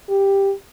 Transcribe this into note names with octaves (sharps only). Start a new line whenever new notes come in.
G4